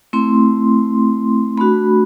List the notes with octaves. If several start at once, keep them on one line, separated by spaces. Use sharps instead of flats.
A3 C4 E4 C6
A3 D4 F#4 B5